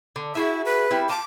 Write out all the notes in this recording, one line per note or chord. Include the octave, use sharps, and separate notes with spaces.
D3
E4 F#4 G#4 E5
B4
G3 C4 E4
F4 A5 D6